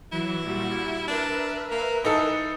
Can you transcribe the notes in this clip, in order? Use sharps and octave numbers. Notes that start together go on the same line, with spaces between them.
E3 F#3 E4
A#2 G3 F#4
D4 A#4 B4 E5
A#3
E3 D#4 A4